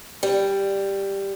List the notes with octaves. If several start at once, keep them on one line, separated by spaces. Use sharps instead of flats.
G3